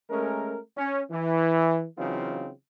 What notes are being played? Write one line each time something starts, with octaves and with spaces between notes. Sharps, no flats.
G#3 A3 C#4 A#4
C#4
E3
C#3 E3 F#3 C4 D#4 F4